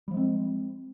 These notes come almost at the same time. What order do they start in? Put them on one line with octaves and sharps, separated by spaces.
G3 F3 G#3 C4